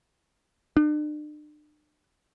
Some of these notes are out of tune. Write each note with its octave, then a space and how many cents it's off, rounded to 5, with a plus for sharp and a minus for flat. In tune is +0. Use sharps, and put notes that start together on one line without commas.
D4 +40